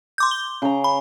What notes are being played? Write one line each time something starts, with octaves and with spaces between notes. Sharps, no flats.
C6 D6 G6
G7
C#3 A#5
B5